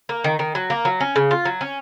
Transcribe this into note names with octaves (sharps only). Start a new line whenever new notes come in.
A#3
D#3
D#3
F#3
A#3
F#3
C#4
C#3
F4
F#3
C#4